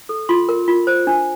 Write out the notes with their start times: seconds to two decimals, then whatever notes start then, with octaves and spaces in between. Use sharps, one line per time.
0.09 A4
0.29 F4 C6
0.49 A#4
0.68 F4
0.87 C5
1.07 D4